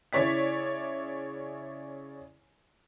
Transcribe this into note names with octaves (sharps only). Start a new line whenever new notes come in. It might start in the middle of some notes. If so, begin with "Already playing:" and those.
C#3 E4 C#5 D5 B6